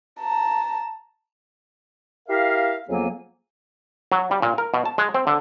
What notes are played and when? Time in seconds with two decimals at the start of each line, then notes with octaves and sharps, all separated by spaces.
0.20 A5 A#5
2.29 E4 G4 A#4 E5 F5
2.89 F2 C#3 F#3 A#3 B3 G#5
4.12 F#3
4.31 G3
4.42 A#2
4.58 A#4
4.74 B2
4.86 A5
4.98 G#3
5.14 C4
5.27 D3